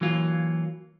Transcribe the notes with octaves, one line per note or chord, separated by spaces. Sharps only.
E3 F#3 A#3 F4